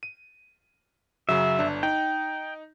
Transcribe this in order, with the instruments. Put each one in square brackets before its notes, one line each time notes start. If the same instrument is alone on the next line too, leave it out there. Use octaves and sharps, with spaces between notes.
[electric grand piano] D#7
[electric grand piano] F#2 C#3 F#3 [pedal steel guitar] E5
[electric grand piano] G1 D4
[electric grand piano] D#4 [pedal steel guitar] G5